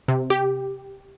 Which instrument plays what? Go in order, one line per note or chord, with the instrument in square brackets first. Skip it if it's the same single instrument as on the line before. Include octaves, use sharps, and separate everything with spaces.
[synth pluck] C3
G4